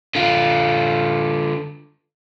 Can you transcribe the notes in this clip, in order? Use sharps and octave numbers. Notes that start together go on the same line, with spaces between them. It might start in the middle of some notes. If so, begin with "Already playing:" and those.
D3 F4